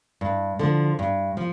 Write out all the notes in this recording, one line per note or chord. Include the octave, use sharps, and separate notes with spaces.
G2
D3 F3
G2
F3